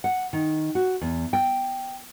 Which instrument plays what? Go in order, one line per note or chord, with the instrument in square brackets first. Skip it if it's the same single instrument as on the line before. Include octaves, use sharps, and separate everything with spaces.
[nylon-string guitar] F#5
D#3
F#4
E2
G5